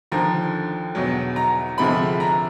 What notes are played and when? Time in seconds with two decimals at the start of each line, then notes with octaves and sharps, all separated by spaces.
0.12 D#2 D3 F3 A#5
0.95 E2 B2 F#3
1.36 A#5
1.78 D2 C3 F3 G#3 B5
2.20 A#5